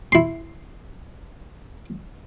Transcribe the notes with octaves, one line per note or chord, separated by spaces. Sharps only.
E4 C6